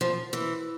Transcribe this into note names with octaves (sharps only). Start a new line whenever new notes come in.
F3
E3